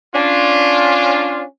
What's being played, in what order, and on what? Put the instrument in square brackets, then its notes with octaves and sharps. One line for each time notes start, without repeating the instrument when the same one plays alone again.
[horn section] C#4 D4 F4